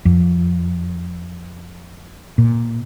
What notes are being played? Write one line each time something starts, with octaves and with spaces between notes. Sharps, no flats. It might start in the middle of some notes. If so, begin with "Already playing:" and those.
F2
A#2